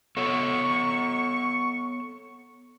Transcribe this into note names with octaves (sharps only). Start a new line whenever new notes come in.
B3 A4 C#5 C#6